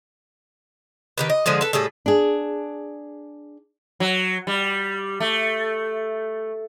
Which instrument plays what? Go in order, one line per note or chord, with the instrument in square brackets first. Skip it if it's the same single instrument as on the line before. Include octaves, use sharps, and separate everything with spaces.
[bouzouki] D#3 G4 B4
D#5
D3 F3 G#3 G#4
A4 B4
A2 G3 G#4 A4
[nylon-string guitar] D4 G#4
[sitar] F#3
G3
A3